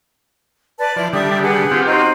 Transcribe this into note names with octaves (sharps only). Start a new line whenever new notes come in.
B4 D5 A5
F3 E4 D5
D3 G3 D5 E5 D#6
G#4 B4 F#5
C4 F4 G4
D#4 F#4 C5